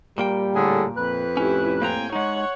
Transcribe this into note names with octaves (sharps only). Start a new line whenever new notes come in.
A#2 G3 A#3 G5
A2 D3 G#4
F2 B4
A2 C#4 E4 G4
A#3 C4 G5 G#5 A#5
G#3 D#4 C#5 F#5